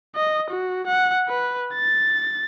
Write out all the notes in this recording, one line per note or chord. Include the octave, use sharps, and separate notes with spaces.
D#5
F#4
F#5
B4
A6